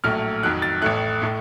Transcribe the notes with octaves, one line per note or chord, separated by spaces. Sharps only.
A#1 A2 F#3 A3 F6
F2 D#3 F#3 F#6
A6
A1 A2 A3 F#6
A2 A3